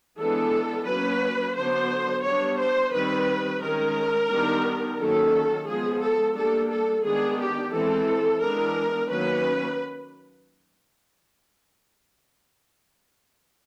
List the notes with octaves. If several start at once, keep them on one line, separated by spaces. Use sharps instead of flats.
E3 G#3 B3 D4 A4
F#3 A#3 C#4 B4
D3 F#3 B3 D4 C5
G3 B3 D4 C#5
C5
D#3 G3 C4 B4
D#3 G#3 C#4 A#4
D#3 G3 B3 D4
D#3 F#3 A#3 C#4 A4
F3 G#3 B3 G#4
A4
G3 A#3 D4 A4
A4
D#3 G#3 B3 D4 G#4
G4
E3 G#3 C4 A4
E3 G#3 B3 D4 A#4
D#3 F#3 A#3 C#4 B4